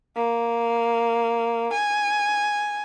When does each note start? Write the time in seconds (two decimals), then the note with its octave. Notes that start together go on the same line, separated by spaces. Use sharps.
0.17 A#3
1.73 G#5